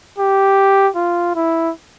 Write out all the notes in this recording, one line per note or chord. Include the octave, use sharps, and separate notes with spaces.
G4
F4
E4